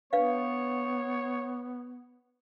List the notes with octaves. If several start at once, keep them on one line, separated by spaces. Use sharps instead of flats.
B3 D4 B4 C#5 F5